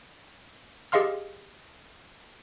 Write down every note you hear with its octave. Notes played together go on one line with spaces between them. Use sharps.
G4 G#4 D#5 F5 C6 F6